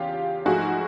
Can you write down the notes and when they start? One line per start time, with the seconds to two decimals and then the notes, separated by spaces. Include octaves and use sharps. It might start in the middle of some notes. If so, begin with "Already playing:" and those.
Already playing: E2 C#3 F4 G4
0.46 G#2 F3 A3 F#4 G#4